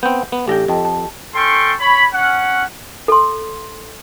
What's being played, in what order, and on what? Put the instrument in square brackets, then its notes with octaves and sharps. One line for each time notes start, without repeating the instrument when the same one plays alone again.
[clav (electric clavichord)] B3 C4 [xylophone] G6
[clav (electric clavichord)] B3
[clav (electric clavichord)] A1 D4 G5 [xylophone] G4 A4 A#6
[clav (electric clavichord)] F2 [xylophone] D#5 G5 A5
[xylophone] A5
[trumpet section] C#4 A4 G5 C6 C#6
C#5 B5
C#4 F#5
[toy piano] A4 C6